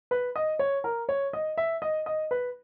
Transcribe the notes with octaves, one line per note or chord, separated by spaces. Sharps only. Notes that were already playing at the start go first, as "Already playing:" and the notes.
B4
D#5
C#5
A#4
C#5
D#5
E5
D#5
D#5
B4